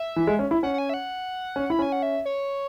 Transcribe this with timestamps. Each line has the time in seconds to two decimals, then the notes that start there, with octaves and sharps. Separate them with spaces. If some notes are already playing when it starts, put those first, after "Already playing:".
Already playing: E5
0.16 E3
0.27 G#3
0.39 C#4
0.51 E4
0.63 C#4 F#5
0.74 F#5
0.78 G#5
0.89 E5
0.94 F#5
1.56 C#4
1.70 E4 B5
1.79 C#4 G#5
1.92 F#5
2.03 E5
2.25 C#5